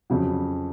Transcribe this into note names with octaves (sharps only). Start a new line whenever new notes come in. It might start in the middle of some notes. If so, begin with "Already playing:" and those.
F2 C#3 F#3